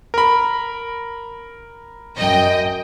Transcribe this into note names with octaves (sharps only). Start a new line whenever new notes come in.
A#4 B5
F#2 D#5 G5